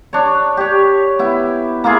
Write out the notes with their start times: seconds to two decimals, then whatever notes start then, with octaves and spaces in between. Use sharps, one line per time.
0.13 D4 C#5
0.57 G4 C#5
1.19 B3 E4
1.84 A#3 E4 F4 G#4